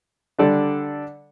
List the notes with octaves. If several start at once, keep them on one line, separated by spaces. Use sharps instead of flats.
D3 G3 D4 A4 D5